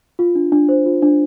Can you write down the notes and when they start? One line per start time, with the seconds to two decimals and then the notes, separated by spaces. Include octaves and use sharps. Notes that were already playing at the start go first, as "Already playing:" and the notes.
0.19 F4
0.35 D4
0.52 D4
0.69 C5
0.86 F4
1.02 D4